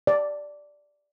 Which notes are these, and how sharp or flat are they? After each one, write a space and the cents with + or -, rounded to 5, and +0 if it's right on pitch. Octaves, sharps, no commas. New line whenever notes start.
D5 -5